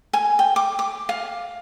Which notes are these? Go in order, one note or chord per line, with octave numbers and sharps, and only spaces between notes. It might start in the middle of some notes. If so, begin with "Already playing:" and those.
G#5
G5
D6
D6
F5